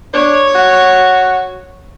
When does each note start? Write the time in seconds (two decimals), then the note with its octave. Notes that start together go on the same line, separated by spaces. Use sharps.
0.13 D4 C#5
0.55 F#4